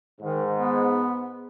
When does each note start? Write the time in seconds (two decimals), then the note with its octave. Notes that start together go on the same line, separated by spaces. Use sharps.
0.21 G#2 D#3
0.57 B3